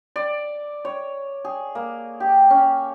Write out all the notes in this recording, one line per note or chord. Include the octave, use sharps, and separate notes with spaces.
D5
C#5
G#4
A#3
G4
C#4